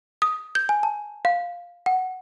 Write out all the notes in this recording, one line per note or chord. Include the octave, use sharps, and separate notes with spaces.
D#6
G6
G#5
A5
F5
F#5